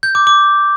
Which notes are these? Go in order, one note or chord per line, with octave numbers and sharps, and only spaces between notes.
G6
D6
D6